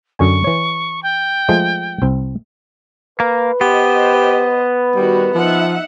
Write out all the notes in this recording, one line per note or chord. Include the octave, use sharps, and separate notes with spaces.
F#2 D3 G#5 C#6
E3 C#5
G5
F3 G#3 A3
C2 C4
A#3 B4
B3 G4 C5 D#5
D#3 G3 F#4
F3 D#4 E5 F#5